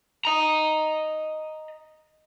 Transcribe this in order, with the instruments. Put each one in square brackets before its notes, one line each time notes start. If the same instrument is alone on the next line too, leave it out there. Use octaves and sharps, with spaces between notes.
[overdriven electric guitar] D#5 A#5